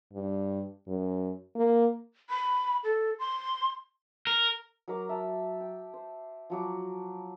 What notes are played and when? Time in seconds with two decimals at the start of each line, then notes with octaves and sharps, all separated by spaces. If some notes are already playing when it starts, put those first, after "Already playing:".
0.13 G2
0.88 F#2
1.56 A#3
2.30 B5
2.84 A4
3.19 C6
4.27 A#4
4.88 F#3 A#4 A#5 D6
5.09 E5 A5
5.60 G5
5.94 C5
6.50 F3 F#3 D6